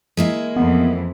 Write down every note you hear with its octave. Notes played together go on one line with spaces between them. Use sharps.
G#3 A#3 E4
F2 E3 B3